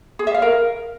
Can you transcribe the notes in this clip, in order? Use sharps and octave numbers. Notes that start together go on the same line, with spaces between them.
G#4
E5
F5
A#4